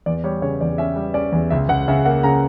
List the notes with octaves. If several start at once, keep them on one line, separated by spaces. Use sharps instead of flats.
E2 D5
G3 C#5
C#3 C#5
E2 D5
C#4 E5
G3
C#4 D5
E2
C#2 E5
C#2 F#5
C#3 E5
A#3 F#5
C#3 A#5